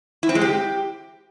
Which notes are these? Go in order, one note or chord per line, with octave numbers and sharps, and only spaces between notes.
E4
C4
G#3
G4